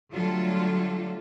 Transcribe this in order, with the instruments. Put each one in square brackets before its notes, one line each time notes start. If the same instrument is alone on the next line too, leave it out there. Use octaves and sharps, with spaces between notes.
[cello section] D3 F#3 G3 A3 F4 A4